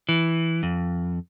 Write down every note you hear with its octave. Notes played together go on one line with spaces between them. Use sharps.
E3
F2